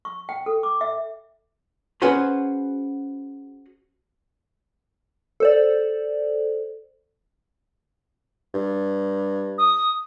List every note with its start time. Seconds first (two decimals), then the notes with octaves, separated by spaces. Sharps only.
0.05 C#6
0.29 G5
0.46 A4
0.63 D6
0.81 E5
2.02 C#4 F#4 G#4 B4 C5 C6
5.40 A4 C5 D5
8.54 G2
9.58 D#6